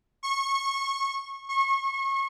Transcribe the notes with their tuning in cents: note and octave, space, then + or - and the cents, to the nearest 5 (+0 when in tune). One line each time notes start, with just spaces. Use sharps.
C#6 -25
C#6 -30